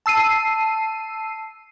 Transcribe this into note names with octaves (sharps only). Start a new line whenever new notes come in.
A5 E6 C7 D#7